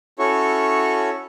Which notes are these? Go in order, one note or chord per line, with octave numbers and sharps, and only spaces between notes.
C#4 E4 F#4 A4 C#5 C#6